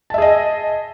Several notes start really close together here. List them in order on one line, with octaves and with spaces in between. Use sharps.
A5 E5 G#4 D#5